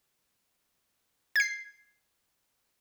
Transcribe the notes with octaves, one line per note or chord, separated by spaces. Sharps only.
G#6 C7